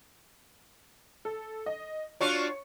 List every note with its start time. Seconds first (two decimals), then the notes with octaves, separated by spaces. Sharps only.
1.25 A4
1.66 D#5
2.21 D4 F4 F#4 C#5 C#6 C#7